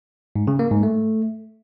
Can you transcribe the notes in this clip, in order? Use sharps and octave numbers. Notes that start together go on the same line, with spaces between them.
G#2
C#3
A#3
G#2
A3